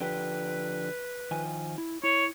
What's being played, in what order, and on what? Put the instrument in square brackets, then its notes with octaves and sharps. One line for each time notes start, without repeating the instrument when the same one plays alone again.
[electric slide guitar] D3 F3 G4 [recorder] B4
[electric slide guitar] D#3 F3 G#5
E4
[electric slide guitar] E4 [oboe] C#5